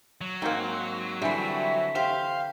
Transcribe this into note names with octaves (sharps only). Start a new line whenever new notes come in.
F#3
G#2 A#3 C4 D#4 F#5
D3 E3 G3 C4 E5
G4 C5 F5